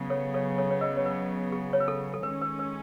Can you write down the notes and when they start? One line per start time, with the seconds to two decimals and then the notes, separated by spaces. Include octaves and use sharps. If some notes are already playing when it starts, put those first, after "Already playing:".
Already playing: C#3 F#3 B3
0.10 A4 C#5
0.34 A4 C#5
0.58 A4 C#5
0.71 C#5
0.81 B4 D#5
0.97 C#5
1.05 B4
1.52 G#4
1.73 C#5
1.80 B4
1.88 A4
2.14 A4
2.23 D#3 G#3 C#4 B4
2.41 B4
2.59 B4